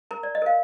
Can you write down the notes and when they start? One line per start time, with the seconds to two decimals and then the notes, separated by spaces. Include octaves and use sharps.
0.11 A#4 A#5
0.23 D5
0.35 D#5
0.42 A#4 F5